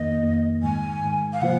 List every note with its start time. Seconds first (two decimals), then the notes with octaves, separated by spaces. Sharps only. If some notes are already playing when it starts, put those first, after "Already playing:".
Already playing: F2 D#3 A#3 D#5
0.23 F2 D#3 A#3
0.63 G#2 D#3 G#3 G#5
1.02 G#2 D#3 G#3
1.33 F5
1.41 C3 F3 A#3 F4 C5 F#5